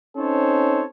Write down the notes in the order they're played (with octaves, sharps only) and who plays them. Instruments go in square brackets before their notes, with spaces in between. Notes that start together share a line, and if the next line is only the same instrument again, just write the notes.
[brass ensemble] C4 C#4 D#4 A4 C5 C#5